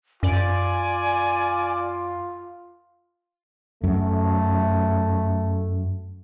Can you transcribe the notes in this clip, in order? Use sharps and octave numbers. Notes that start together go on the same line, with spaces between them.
F#2 F4 D5 G#5
F#2 A3